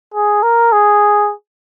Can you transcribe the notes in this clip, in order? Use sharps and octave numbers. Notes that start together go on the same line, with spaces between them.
G#4
A#4
G#4